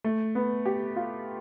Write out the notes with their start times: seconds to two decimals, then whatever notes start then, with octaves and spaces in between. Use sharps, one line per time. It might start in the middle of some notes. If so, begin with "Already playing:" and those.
0.04 A3
0.35 B3
0.65 G4
0.96 F4